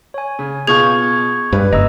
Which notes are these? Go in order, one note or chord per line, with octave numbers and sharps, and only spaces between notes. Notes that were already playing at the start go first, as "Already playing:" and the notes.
C#5 G#5
C#3
B2 F4 G#4 C#6 G6 G#6
G2 B4
F#1 D#5 A#5 E6